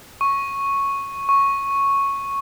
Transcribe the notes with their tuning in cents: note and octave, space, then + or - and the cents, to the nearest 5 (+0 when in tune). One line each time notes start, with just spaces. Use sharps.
C#6 -5
C#6 -5